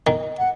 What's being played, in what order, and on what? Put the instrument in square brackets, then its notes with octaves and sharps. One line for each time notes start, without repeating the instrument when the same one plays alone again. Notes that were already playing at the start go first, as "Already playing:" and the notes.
[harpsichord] D#3
[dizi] F#5